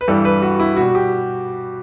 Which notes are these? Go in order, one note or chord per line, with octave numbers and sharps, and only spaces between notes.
B4
G2 E3 G3 A4
B4
F#4
E4
B2 G3 F#4
G4